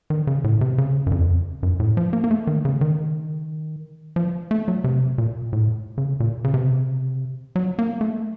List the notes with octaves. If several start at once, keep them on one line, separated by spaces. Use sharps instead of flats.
D#3
C#3
A2
C3
C#3
F#2
F2
F#2
A2
F3
A#3
A#3
A3
D#3
C#3
D#3
F3
A3
F#3
C3
A#2
A2
C#3
A#2
C#3
C3
F#3
A#3
A3